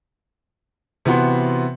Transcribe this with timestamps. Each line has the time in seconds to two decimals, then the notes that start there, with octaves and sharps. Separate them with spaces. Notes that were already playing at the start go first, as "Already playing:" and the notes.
1.05 C3 E3 B3 F#4 C6